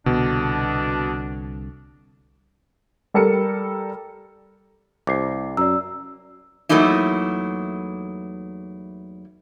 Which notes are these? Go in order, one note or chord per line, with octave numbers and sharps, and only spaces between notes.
C2 B2 D3 D4
G3 A4 A#4 C#7
C2 D6 C7
F#2 D5 A#5 E6
E2 F#3 A3 A#3 D#4 E4